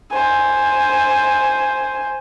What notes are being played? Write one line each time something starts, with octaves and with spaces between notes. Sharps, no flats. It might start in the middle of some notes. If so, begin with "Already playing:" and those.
C5 G#5